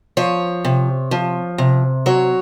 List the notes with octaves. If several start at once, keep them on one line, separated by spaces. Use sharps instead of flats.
F3 C#5
C3
F3
C3
F#3 C#5